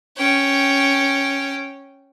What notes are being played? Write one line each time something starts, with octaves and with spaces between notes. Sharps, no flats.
C#4 G5